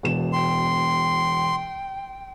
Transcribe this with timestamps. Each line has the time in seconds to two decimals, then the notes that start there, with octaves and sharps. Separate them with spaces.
0.03 E1 B2 E7
0.33 G5 C6